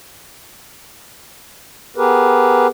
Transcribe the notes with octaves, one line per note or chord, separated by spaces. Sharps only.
B3 G4 G#4 A#4 B4